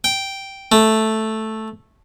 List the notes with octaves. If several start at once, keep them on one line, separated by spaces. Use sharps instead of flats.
G5
A3